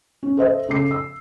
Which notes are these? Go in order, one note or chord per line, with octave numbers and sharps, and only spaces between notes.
C#4
A4 C5 D#5 E5
C#3 A4 D6 C7
E6